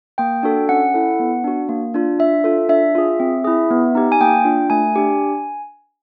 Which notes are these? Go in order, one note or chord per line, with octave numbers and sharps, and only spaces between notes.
A#3 G5
D4 F#4 A4
C#4 F#5
E4 A4
B3
D4 F#4
A#3
D4 F4
D4 E5
F4 A4
D4 E5
F4 G#4
C4
E4 G#4
B3
D#4 G4
G#5
A#3 G5
D4 F4
A3 G#5
D4 G4